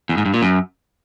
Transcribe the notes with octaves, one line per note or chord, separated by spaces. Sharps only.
E2
G#2
G2
A#2
F#2